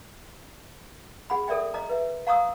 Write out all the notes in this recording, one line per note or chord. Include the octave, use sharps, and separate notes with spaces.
G#4 F#5 B5
A4 A#4 D5 E5 G5
D#5 A#5
B4 E5
F5 A#5 C#6 D#6 E6